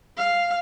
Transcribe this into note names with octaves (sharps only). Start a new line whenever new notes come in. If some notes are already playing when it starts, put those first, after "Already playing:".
F5